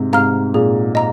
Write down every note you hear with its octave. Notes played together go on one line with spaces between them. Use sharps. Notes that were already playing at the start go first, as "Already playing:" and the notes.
Already playing: G#2 C3
G#2 C3 F5 A#5 F6
A#2 G#4
D#5 A#5